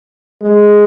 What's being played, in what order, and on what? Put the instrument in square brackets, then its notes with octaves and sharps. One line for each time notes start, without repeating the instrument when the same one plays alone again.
[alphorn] G#3